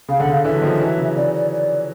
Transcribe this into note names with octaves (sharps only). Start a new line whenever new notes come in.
C#3 F5
D3 F#5
C#3
F5
D3 E3 E5
F#3
D#3 F3
E3 F#3
C#3
C#3 D5
D5
D5